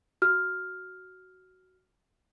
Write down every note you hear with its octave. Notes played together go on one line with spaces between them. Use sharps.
F#4 F6